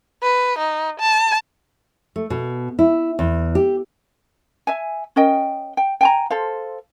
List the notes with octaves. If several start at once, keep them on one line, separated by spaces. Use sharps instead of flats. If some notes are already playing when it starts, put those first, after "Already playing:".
B4
D#4
A5
A3
B2
E4
E2
G4
E5 G#5
C#4 A#4 D#5 G5
G5
G5 G#5 A#5
A4 C5 F5